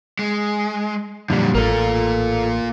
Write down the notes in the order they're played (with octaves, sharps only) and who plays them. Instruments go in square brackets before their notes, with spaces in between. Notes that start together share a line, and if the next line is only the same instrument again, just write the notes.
[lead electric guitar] G#3
[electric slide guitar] F2 A#2 G3 [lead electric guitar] D3 F#3
[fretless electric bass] A1 [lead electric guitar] A#3 F4 [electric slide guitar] A4 A#4